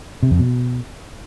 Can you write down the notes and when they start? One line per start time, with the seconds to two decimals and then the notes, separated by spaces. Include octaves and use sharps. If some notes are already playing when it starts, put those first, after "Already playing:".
0.23 C3
0.31 F2
0.39 B2